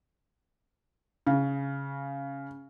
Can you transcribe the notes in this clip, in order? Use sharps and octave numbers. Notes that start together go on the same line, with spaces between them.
C#3